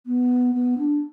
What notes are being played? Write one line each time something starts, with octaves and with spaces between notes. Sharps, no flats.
B3
B3
D4